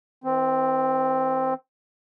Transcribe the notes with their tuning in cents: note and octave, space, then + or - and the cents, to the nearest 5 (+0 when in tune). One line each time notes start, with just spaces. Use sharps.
E3 -45 C4 +0